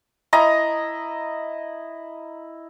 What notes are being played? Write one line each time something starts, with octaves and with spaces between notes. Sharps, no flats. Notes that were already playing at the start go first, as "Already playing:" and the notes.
E4 D#5 A#5 D#6